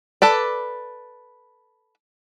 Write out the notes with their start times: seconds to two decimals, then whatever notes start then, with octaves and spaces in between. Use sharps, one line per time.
0.22 A4 B4 D5